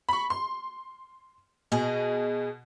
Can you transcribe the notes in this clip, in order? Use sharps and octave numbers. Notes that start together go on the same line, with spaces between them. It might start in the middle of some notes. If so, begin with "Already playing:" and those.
B5 C#6
C6
B2 G#4 D#5